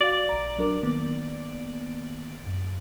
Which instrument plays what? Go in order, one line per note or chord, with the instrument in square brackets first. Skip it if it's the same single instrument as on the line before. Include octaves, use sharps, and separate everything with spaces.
[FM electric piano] F#4 F5 [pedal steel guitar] D5
[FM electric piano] A#1 A#5
F#3 D4 A#4
D#3 A#3 B3
F#2